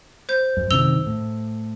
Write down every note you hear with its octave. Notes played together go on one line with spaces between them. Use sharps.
C5 G6
F#2
F#2 C3 D#3 E6 F7 G7
A2